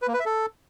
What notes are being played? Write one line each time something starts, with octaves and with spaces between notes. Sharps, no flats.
B4
A#3
B4
E5
A4